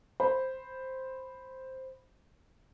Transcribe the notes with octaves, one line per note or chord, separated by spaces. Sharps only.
C5 B5